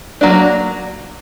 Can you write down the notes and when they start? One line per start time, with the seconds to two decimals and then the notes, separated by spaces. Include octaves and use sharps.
0.21 F#3 A#3 D4